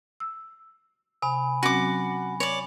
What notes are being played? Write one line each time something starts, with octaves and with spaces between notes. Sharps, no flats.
E6
C3 G#5 B5
F#3 C4 C#4 F#4 D6
C#5 D5